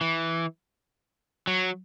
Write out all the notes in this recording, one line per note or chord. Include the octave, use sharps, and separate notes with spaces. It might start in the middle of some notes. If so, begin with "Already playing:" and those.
E3
F#3